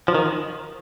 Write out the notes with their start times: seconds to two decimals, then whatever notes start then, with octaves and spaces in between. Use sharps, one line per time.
0.08 F3
0.15 D#3